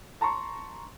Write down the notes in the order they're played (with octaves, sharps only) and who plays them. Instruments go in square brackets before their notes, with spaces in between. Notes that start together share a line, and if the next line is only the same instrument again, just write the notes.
[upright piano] A5 A#5 C6 C#6